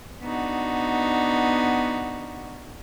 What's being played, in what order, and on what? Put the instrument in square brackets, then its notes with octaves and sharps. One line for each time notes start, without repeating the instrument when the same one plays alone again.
[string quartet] B3 D4 D#4 F#4